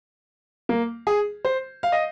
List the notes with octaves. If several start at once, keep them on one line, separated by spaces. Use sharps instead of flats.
A#3
G#4
C5
F5
D#5